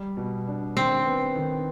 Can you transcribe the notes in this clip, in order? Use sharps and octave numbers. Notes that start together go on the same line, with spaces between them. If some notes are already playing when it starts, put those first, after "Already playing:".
Already playing: G3
B2
D4
D#3 C4
B3
D#3